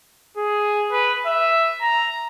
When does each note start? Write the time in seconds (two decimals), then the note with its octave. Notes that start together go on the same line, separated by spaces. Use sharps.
0.38 G#4
0.92 B4
1.26 E5
1.81 A#5